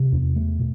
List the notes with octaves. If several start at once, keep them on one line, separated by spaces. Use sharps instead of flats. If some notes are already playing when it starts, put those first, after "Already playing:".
Already playing: C3
E2
A3
B2